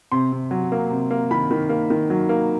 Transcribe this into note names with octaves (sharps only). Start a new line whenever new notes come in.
C3 C6
C3
F#3
A#3
C3
A#3
D#3 B5
D#3
A#3
D#3
F#3
A#3